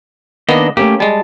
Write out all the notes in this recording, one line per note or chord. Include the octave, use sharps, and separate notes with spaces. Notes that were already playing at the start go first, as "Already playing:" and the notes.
D#3 A#3 B3 D4 D#5
A3 A#3 C#4 G4
G3 G#3 A5